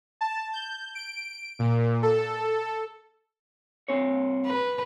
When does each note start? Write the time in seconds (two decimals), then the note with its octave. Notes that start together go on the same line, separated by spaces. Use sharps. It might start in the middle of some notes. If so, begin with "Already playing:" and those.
0.21 A5
0.53 G6
0.95 D7
1.59 A#2
2.03 A4
3.88 C2 C4 C#5
4.46 B4